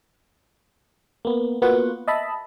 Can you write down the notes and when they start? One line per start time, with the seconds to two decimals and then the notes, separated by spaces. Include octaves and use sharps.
1.25 A#3 B3
1.62 A#3 B3 F4 F#4 F#5
2.08 D#5 E5 A5 B5